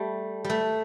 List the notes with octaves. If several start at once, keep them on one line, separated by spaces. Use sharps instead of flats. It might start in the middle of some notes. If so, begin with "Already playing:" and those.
Already playing: G3 A3
G3
A3